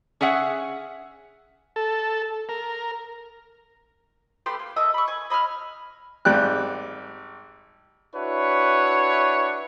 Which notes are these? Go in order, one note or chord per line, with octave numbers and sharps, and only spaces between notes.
C#4 G#4 E5 F#5
A4
A#4
A3 G4 B4 C6
A#3
A4 A#4 D#5 E5
B5 C#6
G#5
D#5 B5 C6 F6
G#1 G3 G5 F#6
D4 E4 F#4 B4 C#5